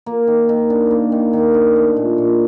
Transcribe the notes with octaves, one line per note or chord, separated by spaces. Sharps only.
A#3
D#3
D#3
D4
A#3
D#3
D#3
D4
A3
A#2
A#2